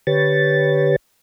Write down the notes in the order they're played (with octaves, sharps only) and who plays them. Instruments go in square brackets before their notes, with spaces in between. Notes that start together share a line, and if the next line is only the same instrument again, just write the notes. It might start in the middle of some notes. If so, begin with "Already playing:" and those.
[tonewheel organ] D3 G4 B4 C#5 A6